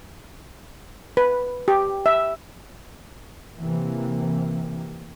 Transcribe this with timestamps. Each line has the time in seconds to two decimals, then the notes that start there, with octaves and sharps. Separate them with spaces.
1.17 B4
1.68 G4
2.06 E5
3.60 C3 E3 A#3